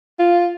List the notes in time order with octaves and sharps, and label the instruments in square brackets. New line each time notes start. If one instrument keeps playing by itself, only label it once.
[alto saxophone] F4